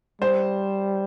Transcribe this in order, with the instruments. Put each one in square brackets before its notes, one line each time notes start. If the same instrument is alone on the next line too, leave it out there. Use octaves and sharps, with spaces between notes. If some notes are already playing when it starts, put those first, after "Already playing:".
[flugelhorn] G3 [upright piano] C5